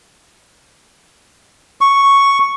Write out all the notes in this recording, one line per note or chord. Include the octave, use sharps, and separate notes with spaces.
C#6